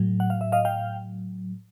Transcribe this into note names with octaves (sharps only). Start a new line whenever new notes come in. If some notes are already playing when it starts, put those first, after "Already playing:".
Already playing: A2 F#3
F#5
F5
E5
D#5 F5
F5 G5